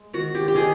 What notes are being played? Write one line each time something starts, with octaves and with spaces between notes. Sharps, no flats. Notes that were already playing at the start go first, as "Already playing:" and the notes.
Already playing: G#3
D#3 F#4
G4
G4
D#3 G#4